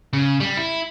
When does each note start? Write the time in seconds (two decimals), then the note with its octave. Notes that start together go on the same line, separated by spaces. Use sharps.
0.13 C#3
0.40 G3
0.57 E4